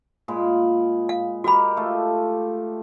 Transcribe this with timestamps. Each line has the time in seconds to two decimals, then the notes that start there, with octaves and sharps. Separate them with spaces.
0.28 A#2 G#3 B5
1.09 F5
1.44 F#4 G4 A#4 D#5 B5
1.77 A3 F4 A4